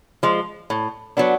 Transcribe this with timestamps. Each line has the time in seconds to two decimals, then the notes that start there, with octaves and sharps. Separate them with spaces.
0.23 F3 G#3
0.70 A2
1.17 F#3 B3 D4